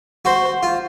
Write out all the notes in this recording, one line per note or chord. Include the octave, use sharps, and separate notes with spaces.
F#4 C5
F4